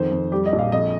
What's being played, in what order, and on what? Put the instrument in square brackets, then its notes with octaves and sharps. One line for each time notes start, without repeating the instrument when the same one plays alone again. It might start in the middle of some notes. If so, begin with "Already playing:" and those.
Already playing: [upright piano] F2 D#3 C5
F2
G3 G4
D#5
A#1
F5
F2 D#5